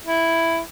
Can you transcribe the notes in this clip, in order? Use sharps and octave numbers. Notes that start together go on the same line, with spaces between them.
E4